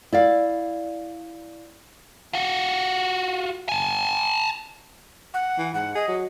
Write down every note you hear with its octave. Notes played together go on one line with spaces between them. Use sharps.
E4 D5 F5
F4 F#4
G#5 A5
F#5
E3
G#2 F#5
G#4 D#5
F#3